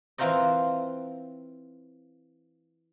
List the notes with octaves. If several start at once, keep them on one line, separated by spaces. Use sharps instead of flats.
E3 C4 F4 A#4 C5 D#5